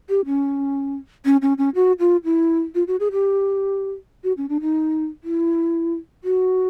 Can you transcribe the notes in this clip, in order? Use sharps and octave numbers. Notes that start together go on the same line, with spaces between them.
G4
C#4
C#4
C#4
C#4
F#4
F4
E4
F4
F#4
G#4
G4
F#4
C#4
D4
D#4
E4
F#4